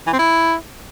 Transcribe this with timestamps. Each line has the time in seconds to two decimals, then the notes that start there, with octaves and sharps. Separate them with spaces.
0.07 E3
0.13 C4
0.19 E4